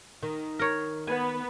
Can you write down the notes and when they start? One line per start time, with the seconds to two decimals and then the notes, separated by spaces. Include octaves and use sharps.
0.23 D#3
0.59 A#4 C#5
1.07 B3 B4 G#5